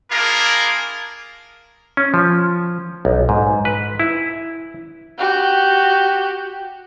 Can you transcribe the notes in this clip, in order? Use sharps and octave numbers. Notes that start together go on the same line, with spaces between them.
A#3 D4 E4 F4 G#4 A#4
C#4
F3
B1
G#2
B4
E4
F#4 G4